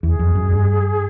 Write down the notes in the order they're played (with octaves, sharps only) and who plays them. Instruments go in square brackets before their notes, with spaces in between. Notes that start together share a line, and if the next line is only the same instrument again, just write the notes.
[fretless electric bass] E2 [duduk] G#4
[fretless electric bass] F2
F#2
G2